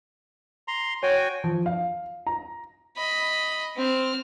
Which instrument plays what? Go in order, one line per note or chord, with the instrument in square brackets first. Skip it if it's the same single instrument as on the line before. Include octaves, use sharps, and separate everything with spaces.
[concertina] A#5 C6
[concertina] F#4 G5 G#5 [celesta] C#5
[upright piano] F3
F5
A#5
[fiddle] D#5 B5
C4 F6